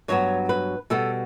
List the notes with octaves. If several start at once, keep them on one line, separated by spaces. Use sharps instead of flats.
G2 F#3 B3 C#5
B4
B2 G3 B3 A4